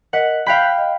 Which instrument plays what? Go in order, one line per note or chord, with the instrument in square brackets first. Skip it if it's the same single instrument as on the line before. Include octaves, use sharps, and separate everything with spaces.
[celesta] A#4 D#5 B6 [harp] F#5
[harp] F5 G5 B5 [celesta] F#6 G6 B6
[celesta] D#5